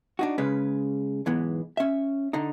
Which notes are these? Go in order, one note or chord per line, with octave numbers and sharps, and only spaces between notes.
D4 D#4 F#4
C#3 G#3 C#4 B4
B1 G#2 E3 G#3 B3
C#4 E5
D3 D#4